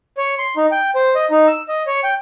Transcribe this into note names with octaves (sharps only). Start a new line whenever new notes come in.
C#5
C6
D#4
G5
C5
D#5
D#4
E6
D#5
C#5
G5